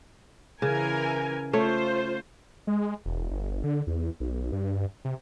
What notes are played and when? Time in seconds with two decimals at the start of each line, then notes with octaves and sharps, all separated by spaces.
0.62 C#3 E3 A#4 G#5
1.53 A3 F4 C5 C#5
2.67 G#3
3.06 E1
3.31 G1
3.64 D3
3.87 E2
4.20 B1
4.52 G2
5.05 C3